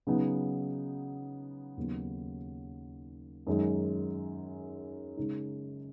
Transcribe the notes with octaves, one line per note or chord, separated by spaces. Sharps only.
C#3 F#3 B3 D#4
D#2 C#3 F#3 B3
F#2 D#3 G#3 D#4
C#3 G#3 D#4